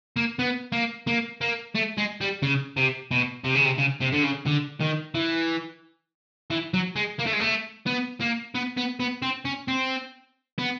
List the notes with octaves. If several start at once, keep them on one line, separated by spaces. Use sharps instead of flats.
A#3
B3
A#3
A#3
A#3
A3
G#3
G3
C#3
C3
B2
C3
C#3
C3
C#3
C3
D3
C#3
D3
D#3
E3
E3
F#3
G#3
A#3
A3
G#3
A3
B3
A#3
B3
B3
B3
C4
C#4
C4
B3